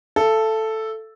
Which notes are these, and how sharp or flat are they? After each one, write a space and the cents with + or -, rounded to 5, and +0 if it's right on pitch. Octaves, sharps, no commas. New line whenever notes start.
A4 +0 E5 +45